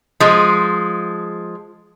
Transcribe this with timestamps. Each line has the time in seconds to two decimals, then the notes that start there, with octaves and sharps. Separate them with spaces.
0.20 F3 G#3